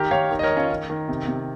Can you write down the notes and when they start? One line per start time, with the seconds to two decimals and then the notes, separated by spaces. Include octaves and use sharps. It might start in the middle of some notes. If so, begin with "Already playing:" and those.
Already playing: D#3 G4 A#4
0.11 D#3 C#5 F5
0.31 D#3
0.39 D#5
0.43 A#4 C#5
0.51 D#3
0.57 C#4 F4
0.70 D#3
0.90 D#3
1.08 C3
1.28 C3